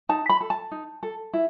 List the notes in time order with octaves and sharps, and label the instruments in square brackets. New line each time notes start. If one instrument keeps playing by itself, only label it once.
[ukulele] D#4 A5
B5
A4
A5
D#4
A4
E4